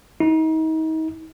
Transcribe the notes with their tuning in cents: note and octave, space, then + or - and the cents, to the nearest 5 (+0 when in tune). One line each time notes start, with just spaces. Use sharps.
D#4 +35